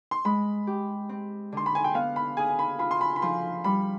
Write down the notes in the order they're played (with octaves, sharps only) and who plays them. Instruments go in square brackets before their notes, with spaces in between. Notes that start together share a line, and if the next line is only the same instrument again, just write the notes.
[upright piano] C6
[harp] G#3 [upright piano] B5
[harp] G4
C4
[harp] D3 [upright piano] C6
[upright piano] B5
G#5
G5
[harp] B3 [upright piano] F5
[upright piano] B5
[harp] G#4 [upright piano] G#5
[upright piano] G#5
B5
[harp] F4 [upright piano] B5
[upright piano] C6
B5
B5
[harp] F3 [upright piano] C6
[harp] G3 [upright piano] B5